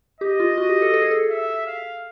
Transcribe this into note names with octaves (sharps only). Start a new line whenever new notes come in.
G4 D#5
F4
F#4
G4
A4
A4
G#4
A4
E5
F5